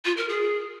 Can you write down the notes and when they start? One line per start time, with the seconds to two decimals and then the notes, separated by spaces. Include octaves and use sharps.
0.05 F4
0.17 A#4
0.29 G#4